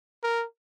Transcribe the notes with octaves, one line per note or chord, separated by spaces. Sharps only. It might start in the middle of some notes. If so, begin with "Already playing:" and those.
A#4